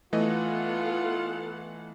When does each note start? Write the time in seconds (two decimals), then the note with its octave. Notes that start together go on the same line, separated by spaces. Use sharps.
0.13 E3 A3 B3 F4 A4 D#5 F#5